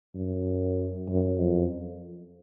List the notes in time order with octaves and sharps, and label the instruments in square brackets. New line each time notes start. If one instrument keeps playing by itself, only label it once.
[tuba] F#2
F#2
F2